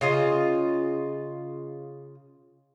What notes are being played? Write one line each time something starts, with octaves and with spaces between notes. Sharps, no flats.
C#3 F4 D#5